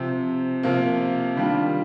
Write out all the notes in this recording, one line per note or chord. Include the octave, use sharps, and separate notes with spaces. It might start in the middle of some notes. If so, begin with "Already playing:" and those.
Already playing: C3 F3 C4
C3 F3 A#3
D#3 G3 D4 F4